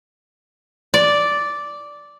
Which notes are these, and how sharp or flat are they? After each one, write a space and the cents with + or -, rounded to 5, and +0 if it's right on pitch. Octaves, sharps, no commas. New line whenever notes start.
D5 -5